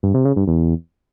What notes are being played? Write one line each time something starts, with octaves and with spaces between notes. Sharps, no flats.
G2
C3
C#3
G2
E2